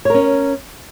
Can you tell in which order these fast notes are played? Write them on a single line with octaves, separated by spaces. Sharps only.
C#5 A#4 C#4